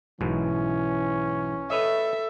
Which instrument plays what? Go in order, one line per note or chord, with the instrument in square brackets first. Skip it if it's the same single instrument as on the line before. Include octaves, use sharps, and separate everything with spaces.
[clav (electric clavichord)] B1 G#2 B2 [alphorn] E3 [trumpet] C#4
[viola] A4 E5 [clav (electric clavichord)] B4 C#5 D#5